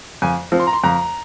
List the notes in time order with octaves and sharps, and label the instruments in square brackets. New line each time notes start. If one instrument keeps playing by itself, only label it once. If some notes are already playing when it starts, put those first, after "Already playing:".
[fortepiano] F2 [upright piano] G#5
[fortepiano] F3 C4
[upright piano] C6
A#5
C6
[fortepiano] F2 [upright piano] A#5